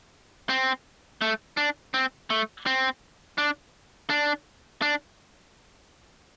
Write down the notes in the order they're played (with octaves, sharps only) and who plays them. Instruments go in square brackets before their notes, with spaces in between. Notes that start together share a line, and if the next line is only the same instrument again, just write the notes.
[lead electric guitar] C4
A3
D4
C4
A3
C4
D4
D4
D4